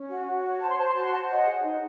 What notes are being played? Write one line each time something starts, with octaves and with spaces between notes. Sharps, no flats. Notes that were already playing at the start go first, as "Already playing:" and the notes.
Already playing: C#4
F#4
F#4
C#5
C5 A5
C6
C5 A5
C6
F#4 A5
C6
C5 F#5 A5
C#5 D#5 F#5
G#4
D#4